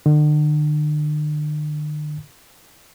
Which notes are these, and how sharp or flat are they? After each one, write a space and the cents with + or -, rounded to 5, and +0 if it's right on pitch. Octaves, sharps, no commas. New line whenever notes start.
D3 +45